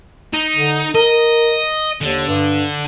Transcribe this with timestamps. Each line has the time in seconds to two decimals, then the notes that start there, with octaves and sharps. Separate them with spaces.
0.33 D#4
0.55 D3
0.95 A#4 D#5
2.01 D#2 D3
2.27 G2